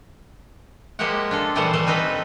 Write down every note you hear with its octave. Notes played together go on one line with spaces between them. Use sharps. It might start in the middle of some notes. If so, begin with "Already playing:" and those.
F3 G#3 A#3 G4 E5 F#5
D4 F4 A4
A#2 E3 G3 A3 C5 F#5
E3 G3 A3 A4
C4 D#4 B4 D#5